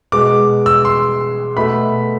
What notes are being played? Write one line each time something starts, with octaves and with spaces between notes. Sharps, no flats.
B2 G#3 D6
E6
C6
B2 A3 B5